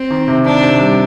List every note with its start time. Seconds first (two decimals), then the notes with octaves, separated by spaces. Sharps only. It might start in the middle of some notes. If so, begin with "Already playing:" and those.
Already playing: C4
0.10 D#3
0.28 C3
0.45 D#3 D4
0.63 C3
0.80 G3